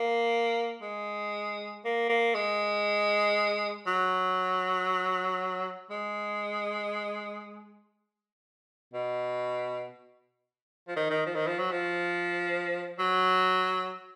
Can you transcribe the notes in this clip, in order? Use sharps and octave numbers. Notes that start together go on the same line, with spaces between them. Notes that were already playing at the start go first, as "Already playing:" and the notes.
Already playing: A#3
G#3
A#3
A#3
G#3
F#3
G#3
B2
F3
D#3
D#3
F3
D#3
F3
F#3
F3
F#3